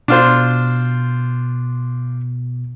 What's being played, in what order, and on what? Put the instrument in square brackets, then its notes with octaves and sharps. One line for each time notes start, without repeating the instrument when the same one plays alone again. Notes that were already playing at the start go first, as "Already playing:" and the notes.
[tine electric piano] B2 [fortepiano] D4 F4 C5